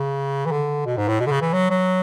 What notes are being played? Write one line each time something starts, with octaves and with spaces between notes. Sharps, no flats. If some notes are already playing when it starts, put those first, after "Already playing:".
Already playing: C#3
E3
D3
B2
G#2
A2
B2
D3
C#3
E3
F#3
F#3